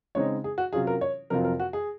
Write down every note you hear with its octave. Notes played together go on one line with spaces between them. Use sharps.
C#3 G#3 C4 D#4 C#5
G#4
F#4
C3 F#3 C#4 F4 G#4
A#4
C#5
F2 C3 F#3 C4 F4 A#4
A#4
F#4
G#4